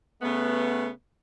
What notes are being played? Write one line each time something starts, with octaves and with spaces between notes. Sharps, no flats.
C#3 A3 B3